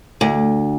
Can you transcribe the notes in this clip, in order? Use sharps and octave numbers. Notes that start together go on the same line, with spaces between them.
D2